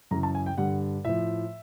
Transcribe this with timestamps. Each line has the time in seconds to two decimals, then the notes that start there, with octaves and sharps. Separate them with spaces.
0.11 F#2 C#3 E3 A#5
0.23 A5
0.35 G#5
0.46 G5
0.57 G2 D3 G3 F#5
1.05 A2 F3 E5